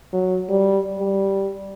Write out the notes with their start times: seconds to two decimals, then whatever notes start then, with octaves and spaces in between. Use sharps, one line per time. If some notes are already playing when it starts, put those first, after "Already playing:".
0.13 F#3
0.49 G3
0.99 G3